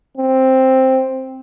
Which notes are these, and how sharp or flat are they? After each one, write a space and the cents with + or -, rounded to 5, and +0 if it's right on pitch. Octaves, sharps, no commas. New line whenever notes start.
C4 +5